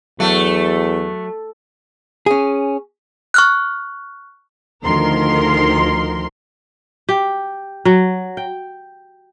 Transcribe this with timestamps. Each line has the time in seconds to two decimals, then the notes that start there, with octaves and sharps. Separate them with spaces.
0.20 E2 F#3 A3
2.26 C#4 G#4
3.34 C#6 F6 F#6
4.84 D2 D#3 F3 A#4 C6
7.09 G4
7.85 F#3
8.37 G5